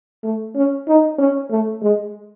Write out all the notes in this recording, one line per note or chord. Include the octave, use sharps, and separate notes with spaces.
A3
C#4
D#4
C#4
A3
G#3